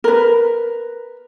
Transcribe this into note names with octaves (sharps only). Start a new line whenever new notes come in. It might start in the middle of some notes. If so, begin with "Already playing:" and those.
A#4 B4